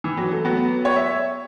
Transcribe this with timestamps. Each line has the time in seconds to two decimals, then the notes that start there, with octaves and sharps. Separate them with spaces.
0.04 E3
0.17 F#3
0.31 A3
0.45 F#3 B3
0.85 C#5
0.96 E5